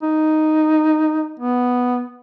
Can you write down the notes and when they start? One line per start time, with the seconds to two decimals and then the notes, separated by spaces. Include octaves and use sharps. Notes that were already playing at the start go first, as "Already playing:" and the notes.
0.02 D#4
1.40 B3